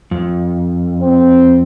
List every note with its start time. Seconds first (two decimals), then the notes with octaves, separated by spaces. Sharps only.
0.11 F2
1.00 C4